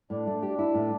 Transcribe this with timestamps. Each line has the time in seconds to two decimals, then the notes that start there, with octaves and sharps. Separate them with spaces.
0.10 A2 D4
0.27 A3
0.43 G4
0.59 E4
0.74 A2